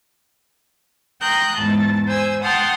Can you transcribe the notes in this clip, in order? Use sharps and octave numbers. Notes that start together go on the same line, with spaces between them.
G5 A#5 C6 D#6 F#6 G6
E2 G#2 A5
C5 G#5 E6
F#5 G5 A5 C6 D#6 F6